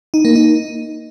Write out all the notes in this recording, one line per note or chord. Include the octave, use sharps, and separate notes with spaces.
D#4
A#3
D#4